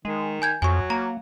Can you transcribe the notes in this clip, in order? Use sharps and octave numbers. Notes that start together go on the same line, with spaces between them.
D#3 G#3
G#5 G6 G#6
F2 F#3 G#5 C#6
A#3 A#5